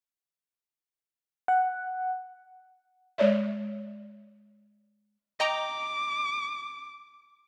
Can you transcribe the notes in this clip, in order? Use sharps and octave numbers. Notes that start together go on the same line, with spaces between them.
F#5
G#3 C#5 D5 E5
D#5 G5 A#5 D6